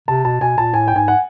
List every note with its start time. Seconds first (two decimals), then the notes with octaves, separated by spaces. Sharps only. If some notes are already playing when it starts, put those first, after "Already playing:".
0.08 C3 A5
0.24 B2 A5
0.41 B2 G#5
0.58 A#2 A5
0.74 A2 G#5
0.88 G5
0.95 G#2 G#5
1.08 F#5